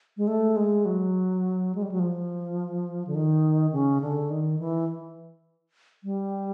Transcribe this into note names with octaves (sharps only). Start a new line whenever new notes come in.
G#3
A3
G#3
F#3
G#3
G3
F#3
F3
D3
D#3
C#3
D3
D#3
E3
G3